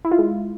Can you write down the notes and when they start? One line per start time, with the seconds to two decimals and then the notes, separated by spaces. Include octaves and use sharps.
0.05 E4
0.12 F4
0.18 G#3